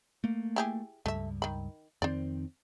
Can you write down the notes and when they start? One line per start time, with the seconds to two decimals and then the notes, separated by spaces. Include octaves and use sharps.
0.24 A3 A#3
0.56 E4 G4 G#4
1.06 C#2 G2 A3 E5
1.42 D#3 B5
2.02 F2 D#3 C4 C5 D5